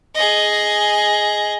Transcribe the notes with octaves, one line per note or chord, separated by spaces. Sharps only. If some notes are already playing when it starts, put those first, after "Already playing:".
G#4 D#5